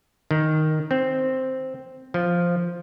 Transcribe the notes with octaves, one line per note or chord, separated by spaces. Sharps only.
D#3
C4
F3